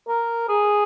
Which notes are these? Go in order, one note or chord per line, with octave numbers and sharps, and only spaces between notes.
A#4
G#4